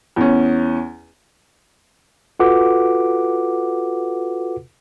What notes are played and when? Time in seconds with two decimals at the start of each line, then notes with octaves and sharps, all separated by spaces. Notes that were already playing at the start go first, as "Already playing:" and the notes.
0.16 E2 C#4
2.40 F4 F#4 A4 B4 F#5 D6